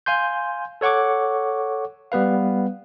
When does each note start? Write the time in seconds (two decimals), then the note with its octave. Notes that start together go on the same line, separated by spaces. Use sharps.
0.06 F5 G#5 C6 G6
0.81 A4 C#5 F#5 C#6 D6
2.12 G3 B3 B4 F5